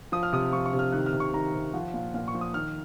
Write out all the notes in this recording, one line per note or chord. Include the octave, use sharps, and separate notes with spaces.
F3 D#6
F6
C3 D#6
F3 C#6
C#6
C3
F6
D#3 F#6
F6
C3
C#6
D#3 A#5
C3
F3 F#5
A#2
A#2 F5
C#6
F3
D#6
D#3 F6